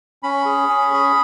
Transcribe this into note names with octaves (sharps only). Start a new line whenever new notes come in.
C#4 B5
G#4
C#4
G#4